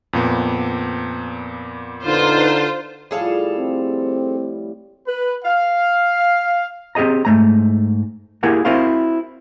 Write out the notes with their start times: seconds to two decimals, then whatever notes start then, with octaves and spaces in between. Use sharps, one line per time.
0.13 F2 A#2 B3
2.05 D3 D#4 F4 B4 C5
3.11 A2 F3 G3 G#4 A4 F5
3.59 C4
5.05 B4
5.43 F5
6.95 C4 G4 G#4 D#5 A#5
7.25 G#2 A3 A#5
8.43 A#3 E4 G4 G#4 A#4 F#5
8.65 C4 E4 F#4 A#4 C5 F5